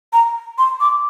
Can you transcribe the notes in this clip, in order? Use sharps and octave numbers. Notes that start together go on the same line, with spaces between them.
A#5
C6
D6